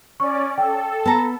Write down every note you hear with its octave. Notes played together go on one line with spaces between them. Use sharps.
C#4 D5 C#6
A4 G5
B3 A5 A#5